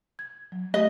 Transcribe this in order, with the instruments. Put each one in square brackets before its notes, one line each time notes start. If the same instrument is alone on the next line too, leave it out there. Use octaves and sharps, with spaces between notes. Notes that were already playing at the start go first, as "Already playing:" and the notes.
[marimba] G#6
F#3
[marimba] A3 G4 [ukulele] D#5